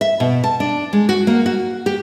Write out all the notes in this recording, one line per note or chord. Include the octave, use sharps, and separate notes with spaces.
E5
B2
A5
D4
G#3
F#4
A#3
F#4
G4